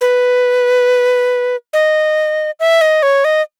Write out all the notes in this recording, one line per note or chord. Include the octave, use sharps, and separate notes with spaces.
B4
D#5
E5
D#5
C#5
D#5